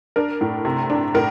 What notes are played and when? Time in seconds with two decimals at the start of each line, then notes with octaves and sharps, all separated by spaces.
0.16 D4 A#4
0.41 A2
0.65 C3
0.90 D4
1.14 A2 A#4